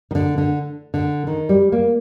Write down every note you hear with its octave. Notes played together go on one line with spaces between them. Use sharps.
D#3
D3
D3
D3
D#3
G3
A#3